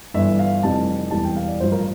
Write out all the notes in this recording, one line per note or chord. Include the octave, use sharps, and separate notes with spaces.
G1 G2 E3 E5
F5
F1 F2 C3 E3 G3 A5
E1 E2 E3 G3 A5
G5
F5
D5
A1 G2 F3 C5
A#4